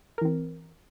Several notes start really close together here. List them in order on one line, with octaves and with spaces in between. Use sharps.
A#4 E3 C4